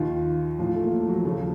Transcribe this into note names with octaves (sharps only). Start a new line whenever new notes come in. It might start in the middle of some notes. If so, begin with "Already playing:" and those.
Already playing: D#2 D#3 F4
A1 A2 F3 F4
A3
A#3
A3
F#3
F#3
D#2 C#3 F3 A3